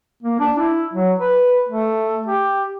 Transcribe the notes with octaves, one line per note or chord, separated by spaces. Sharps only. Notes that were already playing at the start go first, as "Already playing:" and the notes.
A#3
D4
E4
F#3
B4
A3
G4